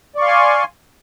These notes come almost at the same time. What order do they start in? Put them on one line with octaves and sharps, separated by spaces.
D5 C#6 F5 C6 G#5